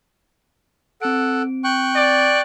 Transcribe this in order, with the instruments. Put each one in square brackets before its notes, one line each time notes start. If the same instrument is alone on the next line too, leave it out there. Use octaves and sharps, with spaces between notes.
[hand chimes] C4 D7 [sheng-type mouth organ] A4 F#5
[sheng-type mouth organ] G5 C#6 F#6
[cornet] D5